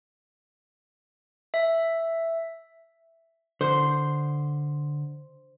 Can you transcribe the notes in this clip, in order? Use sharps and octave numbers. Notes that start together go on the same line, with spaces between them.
E5
D3 C5